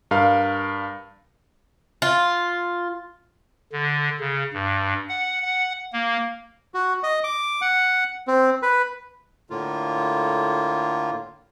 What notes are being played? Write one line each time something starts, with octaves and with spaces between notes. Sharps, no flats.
G2 A#4 F5
F4
D3
C#3
G2
F#5
F#5
A#3
F#4
D#5
D6
F#5
C4
B4
A2 D3 A#3 F4